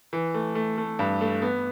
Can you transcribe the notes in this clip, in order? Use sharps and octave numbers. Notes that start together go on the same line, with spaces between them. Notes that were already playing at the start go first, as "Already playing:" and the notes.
E3
A3
A3
A3
G2
A3
B3